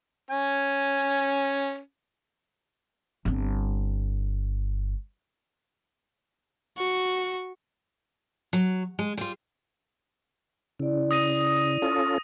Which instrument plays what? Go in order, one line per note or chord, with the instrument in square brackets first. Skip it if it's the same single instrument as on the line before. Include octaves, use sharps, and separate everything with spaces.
[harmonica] C#4 G#5
[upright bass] G1 C4
[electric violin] F#4 C#6
[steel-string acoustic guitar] F#3
G#3
G3 F4
[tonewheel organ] C#3 [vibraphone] E4 D5
[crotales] D#6 A#6 D#7
[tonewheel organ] C#4 F4 A4